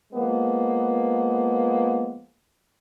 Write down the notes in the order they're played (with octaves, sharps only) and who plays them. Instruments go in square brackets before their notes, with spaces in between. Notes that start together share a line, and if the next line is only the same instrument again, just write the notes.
[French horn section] F3 G#3 A#3 B3